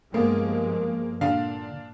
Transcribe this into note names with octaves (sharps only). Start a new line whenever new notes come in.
G2 F3 G#3 A#3 B3
A#2 D3 D4 F5